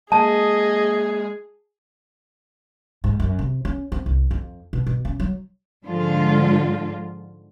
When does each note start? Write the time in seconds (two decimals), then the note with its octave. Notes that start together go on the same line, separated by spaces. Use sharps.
0.12 G#3 A#3 G#4 D#5 A5
3.04 G#2
3.20 F#2
3.39 C3
3.65 C#4
3.92 C4
4.06 C2
4.31 F2
4.73 B2
4.87 B2
5.05 C#4
5.20 F#3
5.85 G#2 D3 F3 G#3 F4